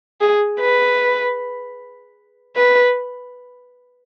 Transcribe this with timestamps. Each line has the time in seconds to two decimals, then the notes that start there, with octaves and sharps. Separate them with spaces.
0.21 G#4
0.60 B4
2.56 B4